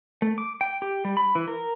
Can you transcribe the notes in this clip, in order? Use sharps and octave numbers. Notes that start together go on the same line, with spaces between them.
A3
D6
G5
G4
G3
B5
E3
A#4